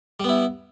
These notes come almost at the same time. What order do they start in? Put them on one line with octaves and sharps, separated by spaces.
G3 B3 E4